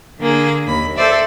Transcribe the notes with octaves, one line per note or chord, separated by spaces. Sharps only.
D3 A#3 G#4
D#2 B5
A4 C5 D5 E5